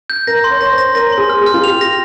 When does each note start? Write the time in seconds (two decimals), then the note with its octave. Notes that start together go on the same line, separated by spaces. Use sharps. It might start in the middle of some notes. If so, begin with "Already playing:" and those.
0.10 G6
0.27 A#4 A#6
0.44 C6
0.51 C#5
0.61 C#5 A#6
0.72 C5
0.78 A#6
0.95 A#4 A#6
1.12 C6
1.18 G#4
1.29 F6
1.41 G#4
1.46 F6
1.54 F4
1.63 G4 F7
1.81 A#6